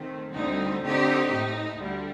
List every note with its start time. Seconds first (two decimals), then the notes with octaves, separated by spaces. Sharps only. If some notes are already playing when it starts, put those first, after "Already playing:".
Already playing: D#3 A3 C4
0.33 D2 D3 G3 C4 D#4
0.81 D3 A3 C4 D#4 G4
1.30 A2 A3 D#4
1.78 D2 D3 G3